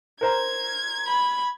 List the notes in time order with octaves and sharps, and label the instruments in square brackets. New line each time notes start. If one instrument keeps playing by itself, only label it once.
[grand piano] A#4 C5 A#5 [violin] G#6
[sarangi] B5